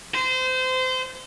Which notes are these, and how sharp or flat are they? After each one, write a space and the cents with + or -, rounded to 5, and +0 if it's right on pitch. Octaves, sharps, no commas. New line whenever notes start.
C5 -25